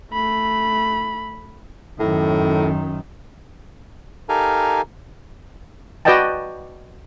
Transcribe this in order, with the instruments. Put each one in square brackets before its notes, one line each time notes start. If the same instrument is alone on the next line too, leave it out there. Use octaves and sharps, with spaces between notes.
[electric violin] A3 B5
[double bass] F#2 D#3 [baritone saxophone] A2
[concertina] D#4 G4 A4 A#4 F5 G#5
[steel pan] F#4 B4 D5 D#5 G5 A5